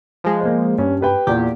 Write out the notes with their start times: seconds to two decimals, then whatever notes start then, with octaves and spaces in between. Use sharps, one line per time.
0.24 F3 G#3
0.41 A#3 C5
0.78 G2 C#4
1.01 G4 B4 G5
1.27 E2 A#2 G4